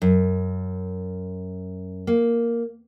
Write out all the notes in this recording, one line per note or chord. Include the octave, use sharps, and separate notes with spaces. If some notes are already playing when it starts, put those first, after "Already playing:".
F#2
A#3